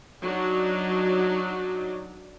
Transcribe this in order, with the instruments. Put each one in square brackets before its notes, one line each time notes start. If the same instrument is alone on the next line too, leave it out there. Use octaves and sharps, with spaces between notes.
[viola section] F#3 D4 D#4